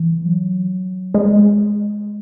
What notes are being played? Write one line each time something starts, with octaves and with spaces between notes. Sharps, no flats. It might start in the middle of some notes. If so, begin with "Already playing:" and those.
Already playing: E3
F#3
G#3